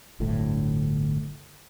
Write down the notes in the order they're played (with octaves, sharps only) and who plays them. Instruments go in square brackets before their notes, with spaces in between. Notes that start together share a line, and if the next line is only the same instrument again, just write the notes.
[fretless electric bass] D1 G1 D2 A2